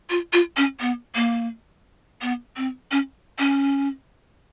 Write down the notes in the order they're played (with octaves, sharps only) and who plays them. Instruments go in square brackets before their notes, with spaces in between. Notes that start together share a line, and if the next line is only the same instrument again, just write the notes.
[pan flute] F4
F4
C#4
B3
A#3
B3
C4
C#4
C#4